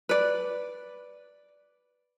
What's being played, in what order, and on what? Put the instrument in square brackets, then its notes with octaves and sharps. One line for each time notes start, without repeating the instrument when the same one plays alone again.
[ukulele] B4 D5